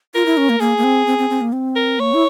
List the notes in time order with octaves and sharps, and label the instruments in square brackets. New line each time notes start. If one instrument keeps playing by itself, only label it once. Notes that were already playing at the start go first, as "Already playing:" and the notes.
[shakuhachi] F4 [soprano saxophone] A#4
[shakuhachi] E4
C#4
A#3
[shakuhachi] A#3 [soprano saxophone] G#4
[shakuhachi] A#3
C4
C4
C4
C4
A#3
C4
[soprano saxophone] A#4
[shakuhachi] A#3 [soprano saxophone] C#5
[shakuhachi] E4